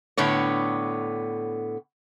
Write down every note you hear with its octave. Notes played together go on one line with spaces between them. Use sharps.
A2 D3 B3 C#5